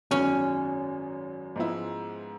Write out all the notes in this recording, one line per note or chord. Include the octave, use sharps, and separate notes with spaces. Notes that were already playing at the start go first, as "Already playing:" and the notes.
G#1 F#2 D#3 F#3 B3 C#4
G#2 F3 G#3 B3 E4